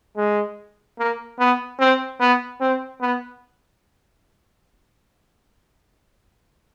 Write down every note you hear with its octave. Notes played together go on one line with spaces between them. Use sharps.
G#3
A#3
B3
C4
B3
C4
B3